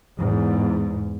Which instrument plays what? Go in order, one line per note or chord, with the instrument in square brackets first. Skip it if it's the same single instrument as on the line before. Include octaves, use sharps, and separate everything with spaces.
[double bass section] E2 G#2